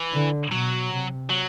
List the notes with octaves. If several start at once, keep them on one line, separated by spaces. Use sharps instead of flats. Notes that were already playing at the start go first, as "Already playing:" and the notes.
Already playing: E3
D3
B2 F#3
C3
F#3